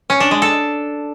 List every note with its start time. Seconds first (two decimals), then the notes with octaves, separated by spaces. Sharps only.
0.10 C#4
0.20 D4
0.31 G#3
0.42 A4